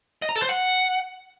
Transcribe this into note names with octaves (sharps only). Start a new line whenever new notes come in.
D#5
A#5
A4
C5
F#5